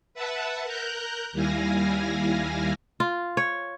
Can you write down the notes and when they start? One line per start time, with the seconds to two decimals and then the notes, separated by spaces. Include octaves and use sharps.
0.14 B4 E5 F#5 A5
0.64 A#4 A#5 F#6 G6
1.33 D#2 G3 E4 F5 G#5 A#6
3.00 F4
3.37 C#5